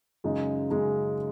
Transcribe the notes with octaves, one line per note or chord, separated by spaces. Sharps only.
F#2 C#3 G#3 D#4
F#2 C#3 G#3 D#4